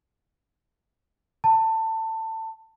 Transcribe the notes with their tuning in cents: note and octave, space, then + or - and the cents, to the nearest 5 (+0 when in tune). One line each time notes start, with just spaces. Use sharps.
A5 +20